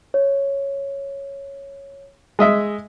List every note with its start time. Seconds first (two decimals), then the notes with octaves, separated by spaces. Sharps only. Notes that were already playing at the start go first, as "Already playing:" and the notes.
0.14 C#5
2.39 G#3 D#5 E5